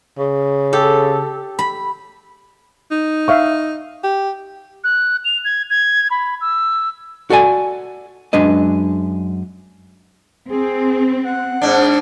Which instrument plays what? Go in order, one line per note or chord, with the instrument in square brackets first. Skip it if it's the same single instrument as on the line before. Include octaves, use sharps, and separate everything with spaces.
[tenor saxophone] C#3
[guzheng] G4 A4
B5
[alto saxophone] D#4
[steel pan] E5 F5 C#6
[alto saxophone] G4
[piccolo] F#6
F7
G#6
G#6
B5
E6
[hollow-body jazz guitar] F#4 A4 D5 G#5
F#2 G#3 D4 B4 D#5
[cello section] C4 [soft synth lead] G#4
[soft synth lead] F#5
[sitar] G#2 D4